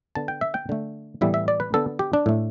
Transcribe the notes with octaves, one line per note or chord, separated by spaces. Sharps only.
D3 B3 A5
G5
E5
G5
D3 A3
A2 E3 G3 B3 E5
E5
D5
B4
D3 B3 A4
G4
D4
A2 A3